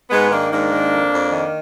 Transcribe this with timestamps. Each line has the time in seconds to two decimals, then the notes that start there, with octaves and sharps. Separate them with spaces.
0.10 G#2 G#3 B3
0.31 D#3 A#3 D4
0.51 G#2 A#3 D4
0.72 D#3
0.92 F2
1.13 F2
1.32 D#3